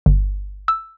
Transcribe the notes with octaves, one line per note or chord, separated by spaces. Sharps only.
G1
E6